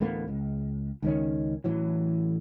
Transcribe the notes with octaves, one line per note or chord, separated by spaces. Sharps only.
A1 D2 A#3 B3
C#2
C#2 D#3 C#4
A1 E3 F#3